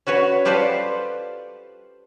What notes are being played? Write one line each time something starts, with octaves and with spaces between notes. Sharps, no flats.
C#4 F#4 B4 C#5
F4 G4 A4 B4 C5 D5